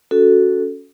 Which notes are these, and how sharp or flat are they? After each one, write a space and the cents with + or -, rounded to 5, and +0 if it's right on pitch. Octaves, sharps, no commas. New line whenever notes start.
C#4 +20 F#4 +0 A4 +0